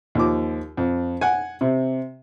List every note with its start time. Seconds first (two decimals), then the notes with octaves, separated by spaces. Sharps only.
0.15 D#2 F3 D6
0.77 F2
1.21 F#5 G#5
1.61 C3